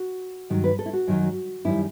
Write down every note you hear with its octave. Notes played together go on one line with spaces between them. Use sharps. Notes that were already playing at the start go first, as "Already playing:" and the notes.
Already playing: F#4
G2 D#3 F#3
B4
A4
E4
F#4
F#2 D#3 F#3
F#2 D#3 G3 E4